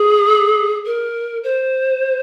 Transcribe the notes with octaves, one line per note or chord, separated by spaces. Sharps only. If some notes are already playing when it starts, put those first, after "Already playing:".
Already playing: G#4
A#4
C5